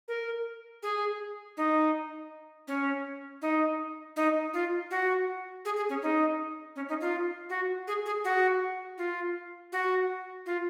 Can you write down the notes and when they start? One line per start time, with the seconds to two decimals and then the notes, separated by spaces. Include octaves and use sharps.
0.08 A#4
0.83 G#4
1.57 D#4
2.68 C#4
3.42 D#4
4.16 D#4
4.54 F4
4.91 F#4
5.65 G#4
5.76 G#4
5.89 C#4
6.02 D#4
6.76 C#4
6.89 D#4
7.01 F4
7.50 F#4
7.87 G#4
8.06 G#4
8.24 F#4
8.98 F4
9.72 F#4
10.46 F4